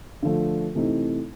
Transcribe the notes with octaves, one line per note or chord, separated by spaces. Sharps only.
D3 F3 A3
C3 E3 A3 C4 D#4